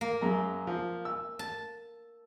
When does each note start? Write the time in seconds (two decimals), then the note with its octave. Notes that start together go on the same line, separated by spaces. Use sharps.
0.01 A#3
0.21 F#2 G#3 A#5
0.67 F3
1.05 E6
1.39 A5